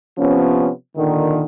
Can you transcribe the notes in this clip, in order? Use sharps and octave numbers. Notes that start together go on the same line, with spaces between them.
C3 F3 B3 C#4
A#2 D3 D#3